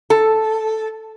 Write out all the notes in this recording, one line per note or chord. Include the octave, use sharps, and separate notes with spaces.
A4